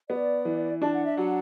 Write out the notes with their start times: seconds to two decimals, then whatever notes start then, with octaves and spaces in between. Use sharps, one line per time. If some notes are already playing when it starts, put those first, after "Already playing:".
0.09 B3 D5
0.45 E3
0.82 D4 A5
0.93 F#5
1.05 E5
1.17 F#3 F#5